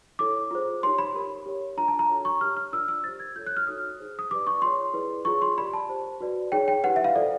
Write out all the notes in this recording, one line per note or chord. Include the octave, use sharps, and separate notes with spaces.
E4 A4 C#5 D6
F4 G#4 C5
D#4 G4 A#4 C#5 C6
B5
G4 A#4 C#5
G4 A#4 C#5
D4 F4 A#4 A#5
A5
A#5
D4 F#4 A4 C#5
C#6
G4 A#4 C#5 F6
F6
D4 F4 A#4 D5 E6
E6
G4 C5 A6
G#6
F4 A4 C#5 G6
F#6
F6
D#4 F#4 A4 C#5 D#6
D#4 G#4 C5
D#6
G4 B4 D5 D6
C#6
F4 G#4 C#5 C6
E4 G#4 B4 D5
F4 G#4 C#5 C#6
C6
G4 A#4 D5 B5
A5
G4 C5
F#4 B4 D5
D#4 G#4 C#5 G5
G5
E4 G4 B4 F#5
E5
F5
F4 A4 C5 D5